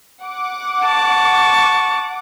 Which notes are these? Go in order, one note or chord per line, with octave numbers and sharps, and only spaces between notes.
F#5 D6
A5 C#6